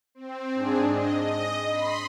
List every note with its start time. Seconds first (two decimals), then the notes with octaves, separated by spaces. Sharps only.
0.15 C4
0.54 G#2 D4 G#4
0.92 D#5
1.23 D#5
1.69 B5 C6